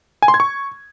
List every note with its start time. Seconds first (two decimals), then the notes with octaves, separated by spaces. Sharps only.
0.22 G#5
0.28 C6
0.34 G#6
0.40 C#6